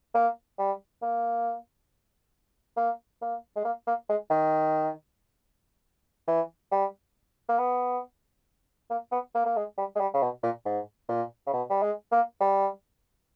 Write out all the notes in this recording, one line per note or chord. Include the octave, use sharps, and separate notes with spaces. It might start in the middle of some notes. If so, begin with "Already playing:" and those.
A#3
G3
A#3
A#3
A#3
G#3
A#3
A#3
G#3
D#3
E3
G3
A#3
B3
A#3
B3
A#3
A#3
G#3
G3
G#3
G3
C#3
B2
A#2
G#2
A#2
C#3
B2
G3
G#3
A#3
G3